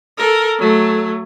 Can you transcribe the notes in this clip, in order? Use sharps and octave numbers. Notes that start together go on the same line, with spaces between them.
A4 A#4
F#3 A3